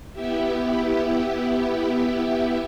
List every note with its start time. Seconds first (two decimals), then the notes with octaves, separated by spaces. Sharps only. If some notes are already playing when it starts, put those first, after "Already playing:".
0.13 B3 E4 G4 E5